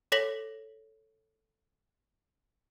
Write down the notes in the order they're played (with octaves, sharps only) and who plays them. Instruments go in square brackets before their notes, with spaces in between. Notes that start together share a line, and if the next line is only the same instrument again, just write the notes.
[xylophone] A4 C#5 A#6 B6 F#7